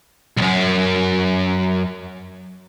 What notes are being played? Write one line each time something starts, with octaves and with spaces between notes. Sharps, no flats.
B1 F#2